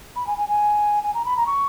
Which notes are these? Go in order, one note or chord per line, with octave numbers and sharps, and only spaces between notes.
B5
G#5
G#5
G#5
G#5
A#5
B5
A#5
C#6